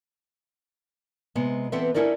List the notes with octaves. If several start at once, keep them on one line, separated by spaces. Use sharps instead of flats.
C3 G#3 B3
E3 B3 C4 A4 B4 E5
C#4 D#4 E4 A4 A#4 D5